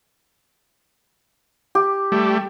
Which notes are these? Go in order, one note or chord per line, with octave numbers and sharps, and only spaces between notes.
G4
G3 A3